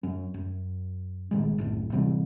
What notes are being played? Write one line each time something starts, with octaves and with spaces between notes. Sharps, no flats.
F#2 C#4
F#2
B1 A#2 D#3 G#3
B1 F#2 A2
D1 C3 E3 G3